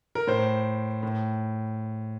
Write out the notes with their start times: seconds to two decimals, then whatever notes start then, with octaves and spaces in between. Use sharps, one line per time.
0.15 A#4
0.27 A2 C5
1.03 A2